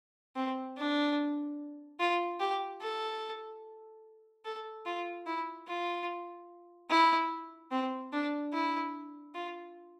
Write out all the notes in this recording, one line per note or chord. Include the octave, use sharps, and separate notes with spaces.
C4
D4
F4
G4
A4
A4
F4
E4
F4
E4
C4
D4
E4
F4